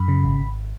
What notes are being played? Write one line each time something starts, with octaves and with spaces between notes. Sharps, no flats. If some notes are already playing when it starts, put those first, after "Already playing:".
Already playing: F#2 B5
C#3
G#1
G#1